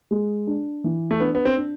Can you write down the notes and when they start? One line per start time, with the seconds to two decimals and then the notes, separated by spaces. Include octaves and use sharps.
0.11 G#3
0.47 D4
0.84 E3
1.11 A3
1.20 B3 D4
1.35 B3
1.45 C4
1.57 D4